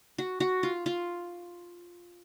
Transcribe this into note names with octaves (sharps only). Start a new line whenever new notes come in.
F#4
F#4
F4
F4